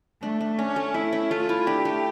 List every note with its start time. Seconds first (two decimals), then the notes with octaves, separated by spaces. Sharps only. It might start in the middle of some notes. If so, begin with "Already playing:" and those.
0.22 A3 D4
0.41 D4
0.59 C#4 D4
0.76 A3
0.94 A3 E4
1.13 C#4
1.31 A3 F4
1.49 E4
1.67 D4 G4
1.85 A3